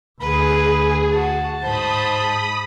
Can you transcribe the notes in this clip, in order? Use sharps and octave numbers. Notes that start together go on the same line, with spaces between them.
D2 G#4 B4 B5
F#4 A5
G#2 C5 B5 D#6